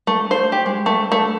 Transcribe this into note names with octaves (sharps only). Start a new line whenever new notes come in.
A3
C5
G4
G#3
A3
A3